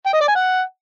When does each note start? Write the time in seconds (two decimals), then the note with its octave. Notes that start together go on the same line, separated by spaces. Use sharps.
0.06 G5
0.13 D#5
0.21 D5
0.28 G#5
0.35 F#5